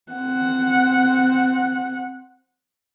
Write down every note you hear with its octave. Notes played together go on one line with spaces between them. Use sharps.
C4 F#5